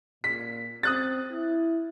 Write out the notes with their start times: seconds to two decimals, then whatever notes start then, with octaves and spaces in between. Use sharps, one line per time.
0.24 A#2 B6
0.83 C4 D#6 F#6 A6
1.33 E4